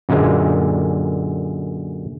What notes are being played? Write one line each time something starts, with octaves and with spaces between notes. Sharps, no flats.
F#2 A#2 D3 G#3